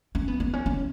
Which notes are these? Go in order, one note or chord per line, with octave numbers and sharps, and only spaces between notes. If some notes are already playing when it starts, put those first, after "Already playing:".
C#4
B3
B3
C#4
C#4